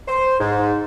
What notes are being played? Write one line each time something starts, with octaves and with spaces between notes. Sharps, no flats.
C5
G#2